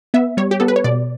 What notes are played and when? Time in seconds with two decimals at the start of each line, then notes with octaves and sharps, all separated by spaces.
0.14 B3 E5
0.37 G3 C#5
0.51 G4
0.60 B3 A4
0.68 B4
0.76 C#5
0.84 B2 D5